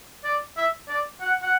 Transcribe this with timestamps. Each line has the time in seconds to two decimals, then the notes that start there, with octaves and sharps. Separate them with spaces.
0.24 D5
0.57 E5
0.88 D5
1.21 F#5
1.42 F#5